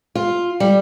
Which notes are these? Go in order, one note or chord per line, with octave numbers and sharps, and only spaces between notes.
F4
G3